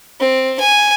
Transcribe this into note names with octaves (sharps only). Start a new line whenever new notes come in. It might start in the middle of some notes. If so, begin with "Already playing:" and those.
C4
G#5